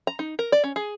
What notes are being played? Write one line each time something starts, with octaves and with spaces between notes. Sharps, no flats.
A#5
D#4
A#4
D5
C#4
G#4